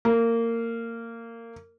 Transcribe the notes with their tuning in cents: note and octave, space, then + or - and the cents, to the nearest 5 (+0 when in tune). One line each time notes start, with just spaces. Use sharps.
A#3 -20